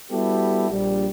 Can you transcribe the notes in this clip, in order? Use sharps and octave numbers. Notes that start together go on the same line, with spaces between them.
G3 B3 E4 F#4 G4 A4
A#1 G3